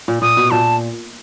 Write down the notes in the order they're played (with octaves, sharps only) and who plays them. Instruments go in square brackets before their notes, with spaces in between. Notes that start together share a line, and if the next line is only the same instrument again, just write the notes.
[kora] A#2
[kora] A#2 [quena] D#6
[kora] B2
[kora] A#2 [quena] A5